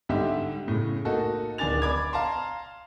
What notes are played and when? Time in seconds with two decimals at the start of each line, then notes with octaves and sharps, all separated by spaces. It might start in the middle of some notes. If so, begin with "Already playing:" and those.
0.09 G#2 D3 G3 G4 E5
0.68 A2 C#3
1.05 A#3 D#4 F#4 A4
1.58 D1 D#3 D4 G#5 A6 F7
1.82 D5 B5 D6 G#6
2.13 F5 A5 A#5 C6